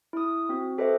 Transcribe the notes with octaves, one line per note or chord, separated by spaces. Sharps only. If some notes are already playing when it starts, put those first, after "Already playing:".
E4 D#6
C4 F#4
G4 A4 B4 C5 D#5 E5